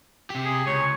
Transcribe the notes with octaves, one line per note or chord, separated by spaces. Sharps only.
C3 G4
G#4
C#2 C#5